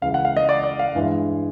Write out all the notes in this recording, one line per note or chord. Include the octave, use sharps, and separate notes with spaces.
C#2 C#3 E3 F5
F#5
F5
D#5
D5
D5
F5
G2 E3 G#3